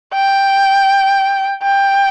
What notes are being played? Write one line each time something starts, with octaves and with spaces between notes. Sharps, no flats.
G5
G5